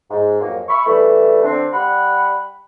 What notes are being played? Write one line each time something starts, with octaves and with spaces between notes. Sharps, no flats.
G#2
F2 F#3 A#3
E5 B5 C#6
E3 G3 A3
D3 C4 D4
G3 F#5 B5